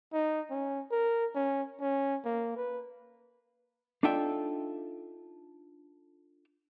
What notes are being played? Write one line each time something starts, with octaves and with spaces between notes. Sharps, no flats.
D#4
C#4
A#4
C#4
C#4
A#3
B4
D4 D#4 F4 A4 E5 G5